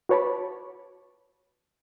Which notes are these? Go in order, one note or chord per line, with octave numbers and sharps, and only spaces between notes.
F#4 B4 C#5 A5 B5 D6